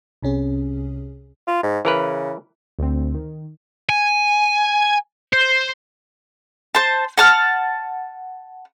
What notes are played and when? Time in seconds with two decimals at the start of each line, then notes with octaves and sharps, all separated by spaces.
0.23 C2 C3 C#4 G#4
1.47 F4
1.63 G#2
1.85 C#3 E3 A#4 B4
2.79 D2 C4
3.15 D#3
3.89 G#5
5.33 C5
6.75 C5 A5
7.18 F#5 A5 F6